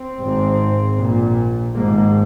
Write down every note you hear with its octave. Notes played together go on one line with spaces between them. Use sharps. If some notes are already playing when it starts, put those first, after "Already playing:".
Already playing: C4
G#1 G#2
A#1 A#2
G#1 G#2 A#3